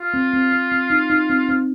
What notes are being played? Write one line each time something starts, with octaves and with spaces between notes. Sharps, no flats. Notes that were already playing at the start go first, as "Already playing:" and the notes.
Already playing: F4
C4
C4
C4
C4
D#4
D#4
C4
C4